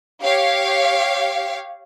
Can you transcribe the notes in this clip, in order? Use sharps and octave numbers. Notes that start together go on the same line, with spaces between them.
G4 C#5 F5